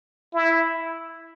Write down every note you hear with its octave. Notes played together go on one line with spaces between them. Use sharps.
E4